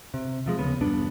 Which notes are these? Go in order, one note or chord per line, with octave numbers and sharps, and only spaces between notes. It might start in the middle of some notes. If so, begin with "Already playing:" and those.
C3
C3 F3 G#3
D#2 C#3 B3
E1 G2 B3 D4